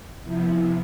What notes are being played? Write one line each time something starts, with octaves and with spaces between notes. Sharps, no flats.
C3 F3 B3 E4